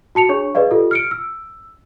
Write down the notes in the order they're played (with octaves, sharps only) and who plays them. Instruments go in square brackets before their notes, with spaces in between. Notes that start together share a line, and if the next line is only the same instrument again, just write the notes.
[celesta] F#4 A5 C#7 F7
D4 G#4 C#5 C#6
G#4 B4 D5 D#5 F5
F4 G4 A4
F6 C#7 D7
E6